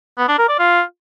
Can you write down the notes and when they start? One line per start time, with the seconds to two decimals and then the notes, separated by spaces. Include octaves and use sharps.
0.18 B3
0.28 D4
0.39 A#4
0.49 D5
0.59 F4